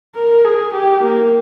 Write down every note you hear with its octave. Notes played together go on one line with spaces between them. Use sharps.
A#4
G#4
G4
A#3